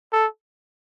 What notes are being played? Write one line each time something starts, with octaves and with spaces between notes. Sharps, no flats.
A4